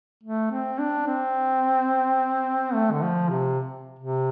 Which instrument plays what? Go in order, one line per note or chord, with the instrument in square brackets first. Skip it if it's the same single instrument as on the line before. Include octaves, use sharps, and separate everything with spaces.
[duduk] A3
C4
D4
C4
A3
D3
F3
C3
C3